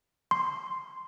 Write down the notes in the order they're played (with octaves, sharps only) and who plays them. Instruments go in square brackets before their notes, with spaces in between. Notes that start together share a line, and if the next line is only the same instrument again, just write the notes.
[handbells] C6